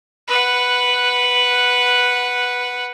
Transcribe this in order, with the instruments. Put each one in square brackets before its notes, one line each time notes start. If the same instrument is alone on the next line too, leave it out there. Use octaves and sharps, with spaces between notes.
[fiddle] B4 F#5